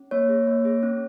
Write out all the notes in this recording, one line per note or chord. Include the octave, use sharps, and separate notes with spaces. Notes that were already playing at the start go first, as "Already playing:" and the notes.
Already playing: C#4
A#3 C#5
G#4
A#3
G#4
C#4